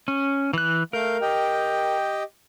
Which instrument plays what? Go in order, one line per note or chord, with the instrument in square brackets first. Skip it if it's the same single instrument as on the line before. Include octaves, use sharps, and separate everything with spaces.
[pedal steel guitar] C#4
E3 F#6
[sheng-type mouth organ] A3 F5 G6 [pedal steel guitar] A#4
[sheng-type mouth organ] G4 D#5 G5